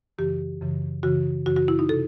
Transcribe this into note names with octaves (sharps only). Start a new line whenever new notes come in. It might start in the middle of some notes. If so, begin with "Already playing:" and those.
F#2 C#3 E3 G4
F#2 C#3 E3
F#2 C#3 E3 F#4
F#2 C#3 E3 F#4
F#4
E4
D#4
C3 A4